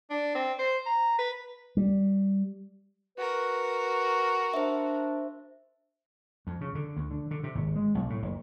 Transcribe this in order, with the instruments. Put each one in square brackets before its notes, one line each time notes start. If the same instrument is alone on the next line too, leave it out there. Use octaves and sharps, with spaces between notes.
[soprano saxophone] D4
C4
C5
A#5
B4
[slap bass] G3
[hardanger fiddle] F#4 A#4 [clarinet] B4
[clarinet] D4 [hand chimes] C5 E5
[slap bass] F2
C#3
D3
D2
D3
D3
C3
G#1
G#3
B1
A2
F#1